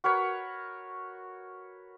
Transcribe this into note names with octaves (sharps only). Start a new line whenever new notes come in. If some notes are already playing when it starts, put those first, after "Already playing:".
F#4 A#4 B4 C#5